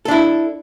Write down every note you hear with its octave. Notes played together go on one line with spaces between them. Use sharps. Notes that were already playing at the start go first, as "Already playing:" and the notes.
D4 E4 A4